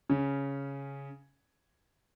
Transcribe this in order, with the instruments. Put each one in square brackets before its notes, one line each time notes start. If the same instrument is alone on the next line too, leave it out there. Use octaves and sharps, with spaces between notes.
[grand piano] C#3 C#4